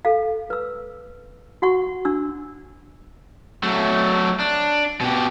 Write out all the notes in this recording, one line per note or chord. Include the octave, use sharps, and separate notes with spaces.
A4 F5
B4 E6
F#4 F#5 C#6
D4 E6
F#3 A3
D4
B2 G4